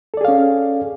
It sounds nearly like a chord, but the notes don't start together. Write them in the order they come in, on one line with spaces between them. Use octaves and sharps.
A4 D5 G#4 F5 C#4